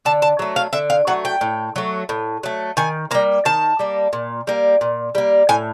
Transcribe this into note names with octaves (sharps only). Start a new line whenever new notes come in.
D3 A5
A5
F#3 A3
F5
D3 E5
F5
F#3 A3 F#5
G5
A2
F#3 A3
A2
F#3 A3
D#3 G#5
G3 A#3 A#5
D#3 A5
G3 A#3
A#2
G3 A#3
A#2
G3 A#3
A2 G#5